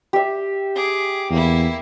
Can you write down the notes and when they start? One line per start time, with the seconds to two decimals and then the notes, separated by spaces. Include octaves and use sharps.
0.13 G4 E5
0.75 G#4 D6
1.31 E2 A#3 E4